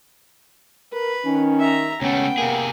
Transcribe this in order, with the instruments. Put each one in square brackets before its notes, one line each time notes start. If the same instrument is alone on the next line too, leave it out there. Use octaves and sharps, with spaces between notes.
[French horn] A#4 [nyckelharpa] B4
[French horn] D#3 [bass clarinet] C#4
[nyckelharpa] E5 A#5
[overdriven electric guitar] C#2 A3 [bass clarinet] B3 [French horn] C#4 [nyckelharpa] G5
[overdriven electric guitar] C3 G#4 [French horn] A#3